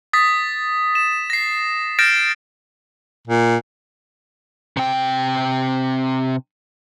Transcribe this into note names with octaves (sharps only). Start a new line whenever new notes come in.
D#6 A6 B6
E7
A#6 C7
F6 G6 A6 A#6 D7 E7
A#2
C3 G5